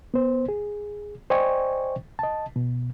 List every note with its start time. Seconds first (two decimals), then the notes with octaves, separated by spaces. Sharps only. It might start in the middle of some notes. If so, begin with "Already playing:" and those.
0.14 B3 C5
0.49 G#4
1.30 C5 D5 D#5 G5 G#5 C#6
2.19 D#5 A5
2.56 B2